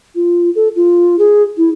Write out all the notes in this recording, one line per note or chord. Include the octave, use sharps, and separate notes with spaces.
F4
A4
F4
G#4
E4